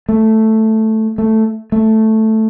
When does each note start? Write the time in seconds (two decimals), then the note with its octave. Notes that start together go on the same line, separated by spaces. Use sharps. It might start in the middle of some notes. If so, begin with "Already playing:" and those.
0.09 A3
1.18 A3
1.72 A3